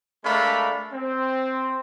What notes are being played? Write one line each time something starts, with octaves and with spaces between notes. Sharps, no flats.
G#3 A3 D4 A#4 F5 B5
C4